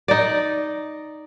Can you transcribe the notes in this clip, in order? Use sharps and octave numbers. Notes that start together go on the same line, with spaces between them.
D#4 D5